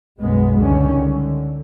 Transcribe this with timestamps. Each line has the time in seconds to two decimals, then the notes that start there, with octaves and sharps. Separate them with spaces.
0.19 B1 F#2 G#3 B3
0.57 C#2 D3 D#3 G3 C#4
1.00 D3